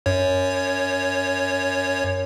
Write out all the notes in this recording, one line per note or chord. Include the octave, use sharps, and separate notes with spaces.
F#2 C#5